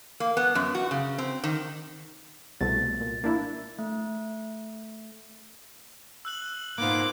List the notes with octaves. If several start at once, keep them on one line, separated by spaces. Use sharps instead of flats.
A#3
B3
F#2
F#4
C#3
C4
D#3
C2 B2 A3 A6
A#2
A#3 D4 E4
A3
E6 F#6 F#7
G#2 A#3 B3 F4 D6